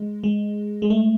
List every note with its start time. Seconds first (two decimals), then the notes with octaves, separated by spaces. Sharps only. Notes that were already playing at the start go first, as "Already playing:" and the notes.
Already playing: G#3
0.24 G#3
0.82 G#3
0.90 A3